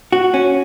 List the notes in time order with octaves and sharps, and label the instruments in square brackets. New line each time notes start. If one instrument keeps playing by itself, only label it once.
[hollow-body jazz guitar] F#4
C#4